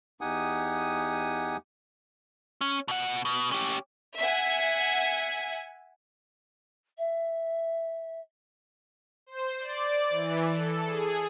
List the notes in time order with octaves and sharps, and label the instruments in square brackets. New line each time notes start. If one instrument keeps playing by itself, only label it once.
[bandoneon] E2 D#4 G4 F#5 G#5 D#6
[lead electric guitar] C#4
B2 F#5
B2
C#4 G4
[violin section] E5 F#5 G#5
[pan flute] E5
[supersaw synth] C5
D5
E3
A4
G#4